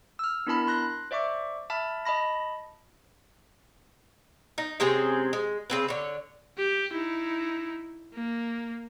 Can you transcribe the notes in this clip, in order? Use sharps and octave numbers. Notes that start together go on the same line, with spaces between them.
E6 F6
B3 D4 E4 A#4 A5 B5
C6 F#6 A#6
C5 D5 E5 C#6 D6
E5 A5 B5 F6
D#5 A5 B5 A#6
D#4
C3 G#3 C4 C#4
G#3
C#3 C4 B4
D3 C#5
G4
D#4 E4
A#3